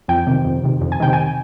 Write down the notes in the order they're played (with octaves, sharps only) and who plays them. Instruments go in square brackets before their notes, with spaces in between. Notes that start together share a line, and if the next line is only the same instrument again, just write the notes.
[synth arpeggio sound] F2 G5
C3 D#3
F2
C3 D#3
F2
G#5
C3 D#3 G5
G#5